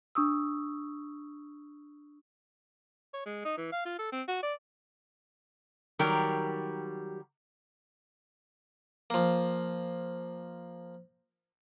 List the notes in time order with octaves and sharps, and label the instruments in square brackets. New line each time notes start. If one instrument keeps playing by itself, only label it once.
[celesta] D4 C#6 D#6 E6
[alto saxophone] C#5
G#3
D#4
E3
F5
F4
A4
C4
F#4
D5
[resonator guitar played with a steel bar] D#3 F#3 G3 G4 A#4
[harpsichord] F3 A#3